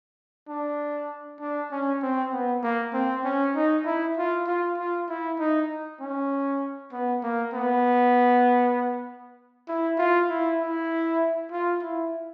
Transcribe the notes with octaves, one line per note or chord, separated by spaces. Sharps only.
D4
D4
C#4
C4
B3
A#3
C4
C#4
D#4
E4
F4
F4
F4
E4
D#4
C#4
B3
A#3
B3
E4
F4
E4
E4
F4
E4